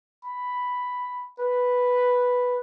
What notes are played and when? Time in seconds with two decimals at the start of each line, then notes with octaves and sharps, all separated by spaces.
0.25 B5
1.40 B4